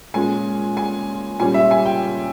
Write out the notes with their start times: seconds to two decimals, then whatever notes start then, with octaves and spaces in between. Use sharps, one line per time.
0.14 A#2 G#3 C#4 G#5
0.77 G#5
1.40 A#2 G3 C#4 G#5
1.54 E5
1.71 G#5
1.86 G5